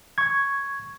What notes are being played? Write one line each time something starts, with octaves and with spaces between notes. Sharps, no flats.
C#6 G#6